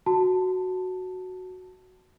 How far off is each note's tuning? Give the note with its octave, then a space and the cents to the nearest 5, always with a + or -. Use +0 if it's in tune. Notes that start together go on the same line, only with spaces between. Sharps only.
F#4 +0 A5 +5